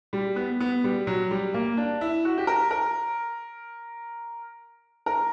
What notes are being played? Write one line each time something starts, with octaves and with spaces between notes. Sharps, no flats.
G3
B3
B3
G3
F#3
G3
A#3
D4
E4
F#4
G4
A#4
A#4
A#4